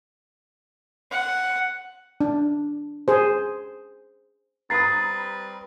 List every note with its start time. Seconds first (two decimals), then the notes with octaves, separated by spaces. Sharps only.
1.11 F#5
2.21 D4
3.08 G#4 C5
4.70 G3 C4 B4 A#5 B5 D#6 A6 C7